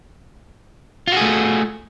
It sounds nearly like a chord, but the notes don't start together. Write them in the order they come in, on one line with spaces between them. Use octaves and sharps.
F4 F#4 G#4 A3